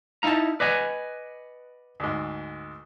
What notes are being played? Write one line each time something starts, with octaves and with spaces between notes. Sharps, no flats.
D#4 E4 F5 A5 A#5
B4 D5 D#5 F#5 G#5
D2 G#2